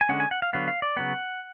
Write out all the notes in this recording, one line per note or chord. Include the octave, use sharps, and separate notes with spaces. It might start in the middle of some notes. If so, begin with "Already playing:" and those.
G#5
D3 G#3 C#4 F#5
G#5
F#5
F5
D3 F#3 B3 F5
F5
D5
C#3 F#3 B3 F#5